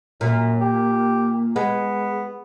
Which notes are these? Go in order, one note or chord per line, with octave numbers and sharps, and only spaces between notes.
F#2 A#2
G4
G#3 B3